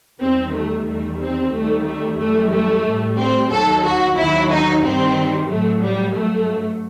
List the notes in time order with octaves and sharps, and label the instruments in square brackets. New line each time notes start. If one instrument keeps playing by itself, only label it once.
[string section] E2 D#3 G3 C4
A3
E2 D#3 G3 A3
C4
D#2 D#3 G3 A3
A3
F#2 E3 G3 A3
A3
A2 G3
C4
D#2 D#3 F#3 A4
F#4
D#2 D#3 F#3 E4
D#4
G2 D#3 G3 C4
A2 F#3 A3
G3
G2 F#3 A3